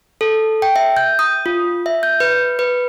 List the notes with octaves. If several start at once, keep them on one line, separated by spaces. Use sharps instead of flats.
A4
G5
E5
G6
D#6
F4
E5
G6
B4
B4